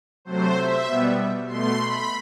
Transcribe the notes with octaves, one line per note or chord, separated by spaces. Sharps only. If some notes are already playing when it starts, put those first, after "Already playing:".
C3 F#3 A3 C5
E5
B2 G3 B3
B2 A3 C6
B5